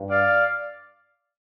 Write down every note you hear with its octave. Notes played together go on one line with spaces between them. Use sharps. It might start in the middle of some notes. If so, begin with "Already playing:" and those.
Already playing: G2
D5 F5